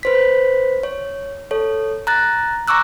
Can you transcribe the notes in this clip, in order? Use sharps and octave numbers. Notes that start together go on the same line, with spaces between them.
B4 C5 B6
C#5
A4 C#5
A#5 F#6 A6
A#5 C#6 D6 E6 F#6